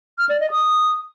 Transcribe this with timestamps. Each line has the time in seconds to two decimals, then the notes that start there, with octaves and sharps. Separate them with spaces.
0.18 F6
0.29 D5
0.40 D#5
0.51 D#6